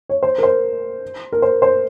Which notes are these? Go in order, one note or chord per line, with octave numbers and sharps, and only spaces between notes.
C#5
C5
A#4
C5
A#4
C5
C5